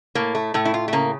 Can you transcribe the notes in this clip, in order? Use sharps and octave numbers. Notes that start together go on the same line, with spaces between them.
A2 A#3
A3
A2 A3
E4
F4
A3
C#3 A#3